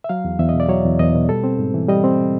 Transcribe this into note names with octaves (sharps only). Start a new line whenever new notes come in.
E5
F#3 F5
E2
E2 E5
D#5
B2
D5
F#3 C#5
E2
E2 D#5
B2
G3 A4
C4
G#2
E3
G3 D#5
C4